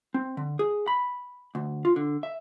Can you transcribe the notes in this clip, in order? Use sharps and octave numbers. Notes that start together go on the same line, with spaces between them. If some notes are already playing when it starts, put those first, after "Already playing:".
C4
D3
G#4
B5
D2
F4
D3
E5